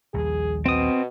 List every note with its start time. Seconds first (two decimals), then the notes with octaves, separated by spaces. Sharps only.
0.14 A#1 D#2 G3 G#4
0.66 B2 C4 D#6